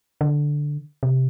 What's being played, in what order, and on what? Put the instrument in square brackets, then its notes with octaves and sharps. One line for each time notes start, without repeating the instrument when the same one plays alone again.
[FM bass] D3
C3